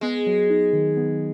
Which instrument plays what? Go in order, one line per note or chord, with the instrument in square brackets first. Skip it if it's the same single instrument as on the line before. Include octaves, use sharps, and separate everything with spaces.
[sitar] G#3 [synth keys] B3
[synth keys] F#3
D#4
D#3
B3